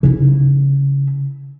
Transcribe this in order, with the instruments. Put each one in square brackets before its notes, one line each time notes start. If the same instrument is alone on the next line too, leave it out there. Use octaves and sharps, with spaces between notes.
[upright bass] C#3 E4